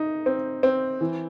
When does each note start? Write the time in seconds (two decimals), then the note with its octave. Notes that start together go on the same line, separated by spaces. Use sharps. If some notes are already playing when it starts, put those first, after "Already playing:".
Already playing: D#4
0.26 C4
0.63 C4
1.01 E3